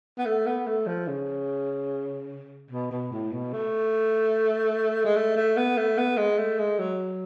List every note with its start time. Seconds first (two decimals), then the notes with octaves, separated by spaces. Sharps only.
0.18 B3
0.26 A3
0.47 B3
0.67 A3
0.87 F3
1.08 C#3
2.71 B2
2.91 B2
3.12 A2
3.32 B2
3.53 A3
5.05 G#3
5.16 A3
5.36 A3
5.57 B3
5.77 A3
5.98 B3
6.17 G#3
6.38 A3
6.59 G#3
6.79 F#3